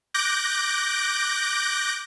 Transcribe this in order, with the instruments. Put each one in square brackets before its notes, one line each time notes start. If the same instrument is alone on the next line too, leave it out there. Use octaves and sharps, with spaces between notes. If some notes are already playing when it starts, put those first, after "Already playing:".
[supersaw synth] D6 F#6 G6 A#6 D7